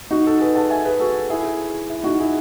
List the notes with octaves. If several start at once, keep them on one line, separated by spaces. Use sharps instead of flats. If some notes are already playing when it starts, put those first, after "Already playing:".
D#4 F#4
F#4 A4
G#4 B4
F#5 A5
E5 G#5
G#4 B4
F#4 A4
E4 G#4
E4
D#4 F#4
E4 G#4